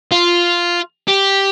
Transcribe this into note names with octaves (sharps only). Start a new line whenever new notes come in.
F4
G4